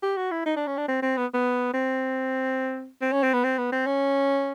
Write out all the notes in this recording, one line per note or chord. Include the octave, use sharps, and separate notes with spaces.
G4
F#4
E4
D#4
D4
C#4
D4
C4
C4
B3
B3
C4
C4
C#4
C4
B3
C4
B3
C4
C#4